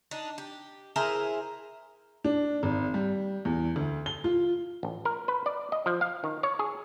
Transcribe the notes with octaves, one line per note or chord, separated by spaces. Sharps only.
D4 D#4
G4
E4 G#4 A#4 C5
D4
G#1
G3
E2
D2
G7
F4
A1
A#4
B4
D5
D#5
F3
F5
D#3
C#5
G#4